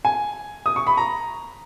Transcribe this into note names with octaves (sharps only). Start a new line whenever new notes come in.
G#5
D#6
C#6
B5
A#5